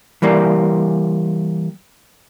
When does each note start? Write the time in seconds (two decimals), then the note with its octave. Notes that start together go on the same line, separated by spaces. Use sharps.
0.22 E3 G3 A#3